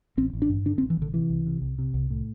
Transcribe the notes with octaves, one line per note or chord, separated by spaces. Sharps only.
A1 C4
A1
D4
G2
D3 D4
C4
A1
E3
A1 D3
C3 E3
C2
C3
C2
C3
C2
A2